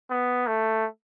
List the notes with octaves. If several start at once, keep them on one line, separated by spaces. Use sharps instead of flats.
B3
A3